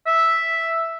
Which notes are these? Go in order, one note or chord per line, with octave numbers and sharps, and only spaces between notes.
E5